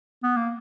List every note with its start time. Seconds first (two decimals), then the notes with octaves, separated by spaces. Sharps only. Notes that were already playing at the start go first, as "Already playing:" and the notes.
0.23 B3
0.37 A#3